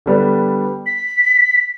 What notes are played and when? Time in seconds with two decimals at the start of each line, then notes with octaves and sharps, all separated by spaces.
0.06 D3 G3 B3 D4
0.86 B6